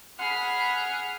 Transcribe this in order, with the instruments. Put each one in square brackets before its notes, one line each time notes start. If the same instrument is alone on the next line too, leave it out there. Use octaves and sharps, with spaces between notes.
[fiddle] G#4 [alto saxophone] F#5 [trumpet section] B5 [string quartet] F6